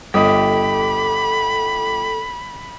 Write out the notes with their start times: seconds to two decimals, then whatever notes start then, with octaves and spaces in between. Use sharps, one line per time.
0.14 G1 G4 A4 D#5 B5 D#6